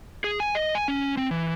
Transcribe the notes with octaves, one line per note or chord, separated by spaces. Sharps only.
G#4
G#5
D#5
G#5
C#4
C4
E3